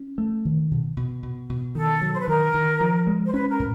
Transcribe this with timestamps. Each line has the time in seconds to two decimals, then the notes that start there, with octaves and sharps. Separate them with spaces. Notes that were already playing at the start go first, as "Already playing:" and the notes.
Already playing: C#4
0.18 A3
0.45 D#3
0.71 B2
0.97 B2
1.23 B2
1.49 B2
1.75 D#3 A4
2.01 F#3
2.13 C5
2.20 B4
2.28 D#3 A#4
2.54 D#3
2.81 F3
3.07 G#3
3.26 C5
3.33 C#4 B4
3.50 A#4
3.60 A2